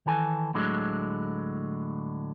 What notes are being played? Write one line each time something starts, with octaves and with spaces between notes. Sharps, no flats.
D#3 E3 A4 G#5
D2 A2 D3 F#3 G#3